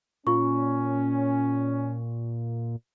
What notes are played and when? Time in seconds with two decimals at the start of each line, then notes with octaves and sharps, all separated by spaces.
0.27 A#2 C#4 F4 C#6